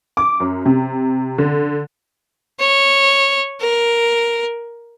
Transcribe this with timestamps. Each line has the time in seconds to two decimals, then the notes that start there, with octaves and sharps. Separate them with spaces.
0.17 D6
0.40 F#2
0.66 C3
1.38 D3
2.59 C#5
3.61 A#4